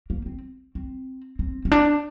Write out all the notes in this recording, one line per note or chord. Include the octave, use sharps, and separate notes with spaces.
A#3
C4
C4
C4
C4
D4